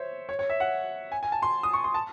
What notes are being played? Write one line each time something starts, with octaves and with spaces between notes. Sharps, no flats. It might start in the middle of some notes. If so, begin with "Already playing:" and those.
Already playing: C5 C#5 E5
C#5
C#5
E5
F#5
G#5
G#5
A5
C6
D#6
C#6
C6
A5